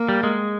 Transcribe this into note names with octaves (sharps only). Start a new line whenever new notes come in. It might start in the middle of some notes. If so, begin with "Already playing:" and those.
Already playing: A#3
G3
G#3